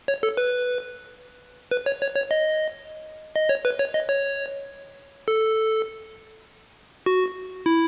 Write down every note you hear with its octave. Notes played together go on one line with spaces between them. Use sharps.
C#5
A4
B4
B4
C#5
C#5
C#5
D#5
D#5
C#5
B4
C#5
D#5
C#5
A4
F#4
E4